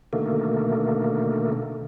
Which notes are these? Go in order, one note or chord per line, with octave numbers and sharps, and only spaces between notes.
B2 D3 D#3 A3 A#3